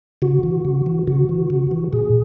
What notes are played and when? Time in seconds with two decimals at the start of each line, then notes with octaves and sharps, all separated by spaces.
0.22 C#3 F#4
0.43 E3
0.65 C#3
0.86 E3
1.07 C#3 F#4
1.29 E3
1.50 C#3
1.71 E3
1.93 A#2 G#4